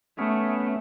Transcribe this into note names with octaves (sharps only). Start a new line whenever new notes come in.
A3 B3 C#4